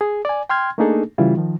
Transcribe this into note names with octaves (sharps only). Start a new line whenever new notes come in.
G#4
D5 G#5
G5 C6 F6 G#6
A3 A#3 D4 D#4 G#4 A4
C#3 E3 G3 E4 F4
D#3 F3